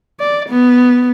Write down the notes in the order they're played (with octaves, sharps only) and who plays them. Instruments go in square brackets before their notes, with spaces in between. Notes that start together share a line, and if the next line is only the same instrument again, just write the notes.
[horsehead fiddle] D5
B3